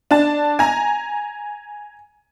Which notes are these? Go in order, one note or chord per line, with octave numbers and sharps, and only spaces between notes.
D4 A5
G#5 A#5